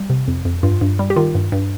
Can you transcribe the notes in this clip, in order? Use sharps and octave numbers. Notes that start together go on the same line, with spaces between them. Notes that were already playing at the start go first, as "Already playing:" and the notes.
Already playing: G3
C3
F2
F2
G2 F4
G2
G3
G4
D#3 F4
G2
G2